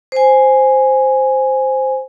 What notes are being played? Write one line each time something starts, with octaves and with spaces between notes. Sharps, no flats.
C5 G#5